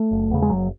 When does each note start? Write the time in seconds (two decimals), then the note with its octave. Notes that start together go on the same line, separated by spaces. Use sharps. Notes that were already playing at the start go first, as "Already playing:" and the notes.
Already playing: A3
0.11 F#1
0.31 E2 C#3
0.42 G#3
0.50 F#1 F#3